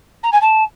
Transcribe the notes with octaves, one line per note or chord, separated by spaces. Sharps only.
A#5
G#5
A5